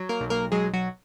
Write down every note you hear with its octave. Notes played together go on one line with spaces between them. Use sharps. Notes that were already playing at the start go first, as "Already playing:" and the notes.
Already playing: F#3
A#3 A#4
B1
A#3 A#4
F#3 G#3 G#4
F#3 F#4